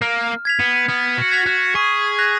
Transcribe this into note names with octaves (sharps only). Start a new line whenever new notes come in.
A#3 F6
G#6 B6 F7
B3
B3 F6
F#4
G#6 B6 F7
F#4
G#4 C#6
F#6 A#6 F7